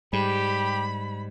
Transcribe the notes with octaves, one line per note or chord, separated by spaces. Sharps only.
G#2 G3 G4 B5